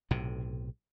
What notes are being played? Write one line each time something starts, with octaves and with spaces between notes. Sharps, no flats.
B1 A2 C3